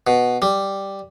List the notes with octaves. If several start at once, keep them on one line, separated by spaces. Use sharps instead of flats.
B2
G3